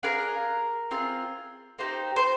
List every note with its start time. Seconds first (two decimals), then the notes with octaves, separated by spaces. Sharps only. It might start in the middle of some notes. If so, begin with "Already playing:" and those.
0.03 D4 F4 G#4 A#4
0.91 C4 F4 G#4
1.78 A#3 D#4 G4 C5
2.16 C5